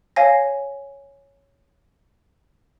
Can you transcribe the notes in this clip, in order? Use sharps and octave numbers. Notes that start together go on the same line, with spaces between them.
C#5 F5 G#5 A#6